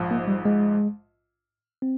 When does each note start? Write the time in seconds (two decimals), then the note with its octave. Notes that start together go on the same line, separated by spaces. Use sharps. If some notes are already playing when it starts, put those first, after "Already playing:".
Already playing: A#1 G#2 F3
0.11 A#3
0.28 G3
0.45 G#3
1.82 C4